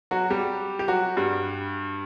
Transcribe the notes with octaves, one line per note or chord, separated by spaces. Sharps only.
F#3 F#4
G3 G4
G4
F#3 F#4
G2 G3